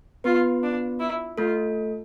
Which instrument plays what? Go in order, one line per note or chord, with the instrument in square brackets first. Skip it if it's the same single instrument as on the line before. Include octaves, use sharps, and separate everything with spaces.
[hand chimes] B3 B4 [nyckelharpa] F4
[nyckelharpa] D4
E4
[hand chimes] A3 A4 [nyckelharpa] F4